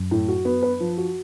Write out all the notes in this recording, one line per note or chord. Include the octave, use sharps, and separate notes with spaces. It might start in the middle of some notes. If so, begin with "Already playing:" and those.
Already playing: F#2
A2
F#4
B3
B4
F3
F#4